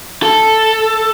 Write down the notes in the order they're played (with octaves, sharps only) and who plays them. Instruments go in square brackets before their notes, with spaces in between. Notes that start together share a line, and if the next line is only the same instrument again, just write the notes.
[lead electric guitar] A4